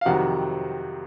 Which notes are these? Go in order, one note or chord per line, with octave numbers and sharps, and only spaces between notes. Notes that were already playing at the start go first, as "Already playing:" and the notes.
F5
F2 C3 D#3 F#3 F#5